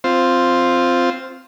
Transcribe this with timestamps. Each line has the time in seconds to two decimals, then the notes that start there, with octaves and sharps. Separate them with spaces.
0.04 C4 F4 C5